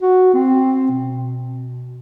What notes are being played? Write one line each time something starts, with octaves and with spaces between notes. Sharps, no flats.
F#4
C4
B2